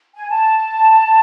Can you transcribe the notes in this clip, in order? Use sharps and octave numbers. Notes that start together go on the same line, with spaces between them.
G#5
A5